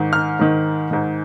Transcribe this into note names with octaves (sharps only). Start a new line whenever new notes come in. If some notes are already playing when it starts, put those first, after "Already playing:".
Already playing: G#2 D#3
F6
G#2 D#3
G#2 D#3